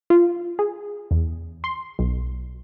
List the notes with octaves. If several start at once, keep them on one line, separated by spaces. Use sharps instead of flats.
F4
G#4
E2
C6
B1